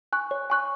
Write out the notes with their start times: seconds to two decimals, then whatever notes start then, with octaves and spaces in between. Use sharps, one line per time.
0.13 G#5 C#6 F#6
0.31 C#5
0.50 G#5 C#6 F#6